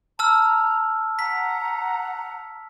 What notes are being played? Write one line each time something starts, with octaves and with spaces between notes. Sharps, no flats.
A5 A#5 E6 F6
F#5 A#5 B6